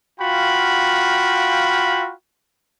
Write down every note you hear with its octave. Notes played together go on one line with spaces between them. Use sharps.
F4 F#4 F5 G5 B5